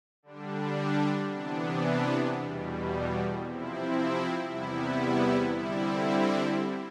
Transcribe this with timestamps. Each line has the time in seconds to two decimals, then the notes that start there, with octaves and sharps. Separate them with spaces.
0.23 D3 G3 D4
1.30 C3 E3 B3 D4
2.36 E2 B2 G3
3.43 C3 F3 C4 E4
4.49 E2 C3 G3 B3 E4
5.56 D3 G3 C4 E4